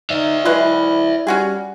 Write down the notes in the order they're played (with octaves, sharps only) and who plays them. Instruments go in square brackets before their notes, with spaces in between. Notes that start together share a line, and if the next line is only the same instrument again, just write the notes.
[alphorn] D#4 [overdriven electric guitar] D5 E5
[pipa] F#3 G#3 B4 [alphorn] E4
[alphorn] G3 [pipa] C#4 F#4 G#4